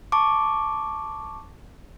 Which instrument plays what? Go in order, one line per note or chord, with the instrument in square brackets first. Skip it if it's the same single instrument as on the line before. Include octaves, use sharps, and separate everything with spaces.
[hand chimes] A5 C#6 D6